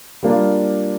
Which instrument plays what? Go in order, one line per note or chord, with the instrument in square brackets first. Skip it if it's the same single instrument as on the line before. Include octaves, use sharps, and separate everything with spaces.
[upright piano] G3 A#3 D4 F4